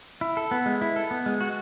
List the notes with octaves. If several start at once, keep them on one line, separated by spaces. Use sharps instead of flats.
E4
A4
B3
G#3
E4
A4
B3
G#3
F#4